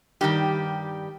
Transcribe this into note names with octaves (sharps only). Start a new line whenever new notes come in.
G2 D#3 G3 G4